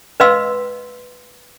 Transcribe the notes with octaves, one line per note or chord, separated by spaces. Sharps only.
B4 D#5 F5 C6 E6